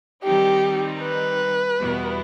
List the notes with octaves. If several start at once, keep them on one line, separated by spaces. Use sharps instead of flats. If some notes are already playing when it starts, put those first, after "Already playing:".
D#3 G3 C4 D#4 G4
B4
E2 B2 G3 B3 E4